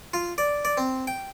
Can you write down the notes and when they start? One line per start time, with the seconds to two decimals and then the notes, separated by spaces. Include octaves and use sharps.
0.14 F4
0.38 D5
0.65 D5
0.77 C4
1.07 G5